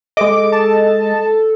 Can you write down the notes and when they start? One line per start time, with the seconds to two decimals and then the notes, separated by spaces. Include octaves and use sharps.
0.17 G#3 A4 D#5 D6
0.52 A5